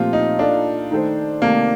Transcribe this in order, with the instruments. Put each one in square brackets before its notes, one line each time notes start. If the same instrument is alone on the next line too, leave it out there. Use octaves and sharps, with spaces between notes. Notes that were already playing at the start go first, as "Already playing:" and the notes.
Already playing: [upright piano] A#2 F3 A3 C4 G4 [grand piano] F4
[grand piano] D#4
[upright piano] A#3 F4 A4 [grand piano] D4
[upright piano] D#3 A3 D#4 A4 C5
[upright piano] C3 D#3 A3 [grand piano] A#3